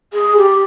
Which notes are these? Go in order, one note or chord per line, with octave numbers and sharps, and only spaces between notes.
G#4
G4